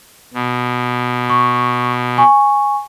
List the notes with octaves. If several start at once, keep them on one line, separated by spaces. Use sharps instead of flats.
B2
C#6
G#5 C#6